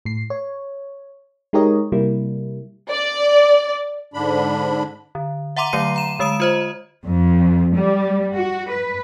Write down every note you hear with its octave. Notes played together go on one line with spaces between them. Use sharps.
A2 C7
C#5
G#3 D#4 G4 A#4 C#5 D#5
C3 G3 A#3 E4
D5
G#2 D3 D4 B5
D3
E5 F#5 A#5 C6 D6 D#7
D3 F#3 A3 C7 D#7
A#5 E7
D3 G#3 D#6 D7 E7
F4 C5 D#5
F2
G3
F#4
B4